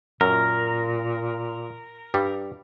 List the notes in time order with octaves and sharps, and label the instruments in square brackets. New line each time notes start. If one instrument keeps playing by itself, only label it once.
[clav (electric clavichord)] F#2 [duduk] A#2 [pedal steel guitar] A#4
[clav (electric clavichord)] G2 G3